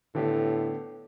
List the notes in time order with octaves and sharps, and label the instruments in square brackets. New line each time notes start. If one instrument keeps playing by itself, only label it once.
[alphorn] A2 [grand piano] D3 B3 G4